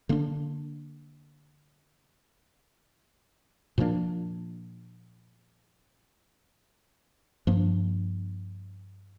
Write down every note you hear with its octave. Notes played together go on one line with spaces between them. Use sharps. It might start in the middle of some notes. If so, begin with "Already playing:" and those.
D3 A#3 D4
A#2 F3 A#3 D4
G2 F3 A#3 D4